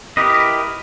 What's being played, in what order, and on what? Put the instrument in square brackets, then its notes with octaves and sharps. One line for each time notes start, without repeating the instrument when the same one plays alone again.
[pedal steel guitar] E4 G4 A#4 B4 D#5